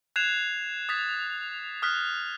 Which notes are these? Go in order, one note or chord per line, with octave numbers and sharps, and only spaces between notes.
F#6 G#6 C7 E7 F7
D#6 G#6 A6 B6
D#6 F6 F#6 B6